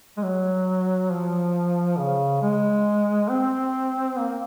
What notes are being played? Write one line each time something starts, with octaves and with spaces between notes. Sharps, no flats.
G#3
F#3
F3
C#3
G#3
C4
A#3